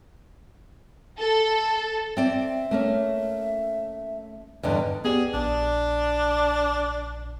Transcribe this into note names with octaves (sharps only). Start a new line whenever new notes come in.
A4
C4 D5 E5
A3 A#3 C#4
E2 G2 D3 D#5
B3 G4 G#4 D5
A#1 D4